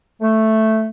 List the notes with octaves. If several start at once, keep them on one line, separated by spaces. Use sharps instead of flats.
A3